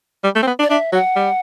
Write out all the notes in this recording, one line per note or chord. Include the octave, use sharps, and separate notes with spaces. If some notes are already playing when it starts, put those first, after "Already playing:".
G3
A3
C4
B3
D4
D5
D4 E5
F#3 F#5
G3